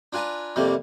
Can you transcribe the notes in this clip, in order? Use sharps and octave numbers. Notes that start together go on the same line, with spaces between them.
D4 F4 B4 G#5 A#5
F2 C3 G3 A3 A#3